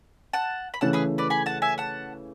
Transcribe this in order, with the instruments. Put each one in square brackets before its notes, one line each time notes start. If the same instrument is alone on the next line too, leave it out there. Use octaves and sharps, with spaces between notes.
[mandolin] F#5 A5
B5
[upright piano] C#3 E3 A3 C#4 E4 [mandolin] F#5 A5
[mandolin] G#4 B4
B4 D5
G#5 B5
F#5 A5
E5 G#5
F#5 A5